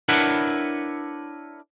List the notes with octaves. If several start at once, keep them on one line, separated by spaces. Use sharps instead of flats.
D4 E4 A#4 B4 C#5 F#5